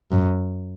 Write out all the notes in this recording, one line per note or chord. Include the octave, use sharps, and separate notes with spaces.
F#2